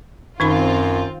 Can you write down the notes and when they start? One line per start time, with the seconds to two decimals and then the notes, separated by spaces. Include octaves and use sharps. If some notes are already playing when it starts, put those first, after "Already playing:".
0.40 F#2 D#3 C4 D#4 F4 B5